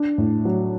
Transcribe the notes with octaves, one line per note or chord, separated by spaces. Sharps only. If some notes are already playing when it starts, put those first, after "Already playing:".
Already playing: D4
A2
F#3